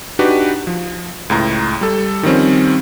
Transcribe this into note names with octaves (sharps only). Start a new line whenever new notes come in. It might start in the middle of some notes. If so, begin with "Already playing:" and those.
D4 D#4 F#4 G4 B4
F3
C#2 A2 A#5
G3 A4
D#3 F3 G3 C4 C#4